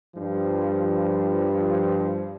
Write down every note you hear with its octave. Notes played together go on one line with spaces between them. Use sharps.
G2 F3